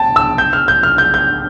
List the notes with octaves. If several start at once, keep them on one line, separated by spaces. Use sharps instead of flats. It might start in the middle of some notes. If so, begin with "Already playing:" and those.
Already playing: G5 A5
E6
G6
F6
G6
F6
G6
G6